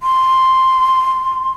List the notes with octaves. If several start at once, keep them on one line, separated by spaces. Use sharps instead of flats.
C6